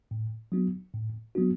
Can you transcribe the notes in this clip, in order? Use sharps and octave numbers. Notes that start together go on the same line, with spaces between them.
A2
F#3 B3 D4 F#4
A2
F#3 B3 D4 F#4